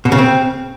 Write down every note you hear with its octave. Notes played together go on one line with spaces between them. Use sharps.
B2
C#3
C4